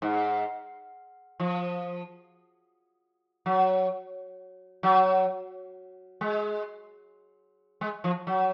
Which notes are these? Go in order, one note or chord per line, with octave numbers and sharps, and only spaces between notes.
G#2
F3
F#3
F#3
G#3
G#3
F3
F#3